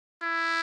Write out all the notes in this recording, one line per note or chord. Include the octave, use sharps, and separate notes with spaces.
E4